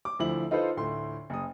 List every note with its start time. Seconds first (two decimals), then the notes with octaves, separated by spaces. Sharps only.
0.05 D6
0.19 D2 F3 E4 F#7
0.51 D#4 F4 A4 B4 C5
0.77 D2 A2 C6
1.30 F#1 D#6